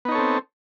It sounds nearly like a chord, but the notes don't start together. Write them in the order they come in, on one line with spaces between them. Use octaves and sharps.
B3 D#4 C#5 A4 C4